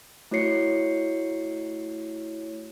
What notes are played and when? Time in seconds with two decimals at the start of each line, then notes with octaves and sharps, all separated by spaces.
0.31 A3 E4 F#4 C#5 C7 C#7